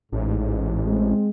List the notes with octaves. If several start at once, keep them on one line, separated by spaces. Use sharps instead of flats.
A1 G#2
G#3 C4